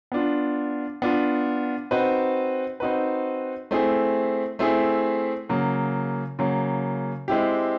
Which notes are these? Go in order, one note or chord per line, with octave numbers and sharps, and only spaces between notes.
B3 D4 F4
B3 D4 F4
C4 D#4 F#4 B4
C4 D#4 F#4 B4
A3 C4 E4 G#4
A3 C4 E4 G#4
C#3 F#3 A#3
C#3 F#3 A#3
G#3 C4 E4 G4